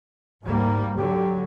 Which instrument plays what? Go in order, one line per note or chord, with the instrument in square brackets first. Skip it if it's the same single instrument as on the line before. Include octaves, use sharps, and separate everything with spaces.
[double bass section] D2 G3 A#3 [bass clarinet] G#2
[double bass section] D3 F#3 [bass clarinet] G4